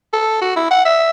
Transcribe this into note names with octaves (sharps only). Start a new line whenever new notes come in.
A4
F#4
E4
F#5
E5